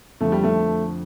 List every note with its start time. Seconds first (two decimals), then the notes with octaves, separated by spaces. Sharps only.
0.21 F2 D3 F3 A3
0.32 G3
0.44 A3